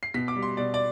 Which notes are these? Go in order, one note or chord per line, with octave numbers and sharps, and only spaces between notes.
C7
B2 B6
D6
G3
C6
B2 D5
D5